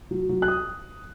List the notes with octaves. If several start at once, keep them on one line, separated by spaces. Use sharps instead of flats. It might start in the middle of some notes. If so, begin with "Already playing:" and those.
F#3
F#3
F#6
D#6